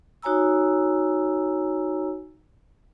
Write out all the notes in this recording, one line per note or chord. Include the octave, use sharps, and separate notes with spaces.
D#4 F#4 C#5 G#5 A#5 E6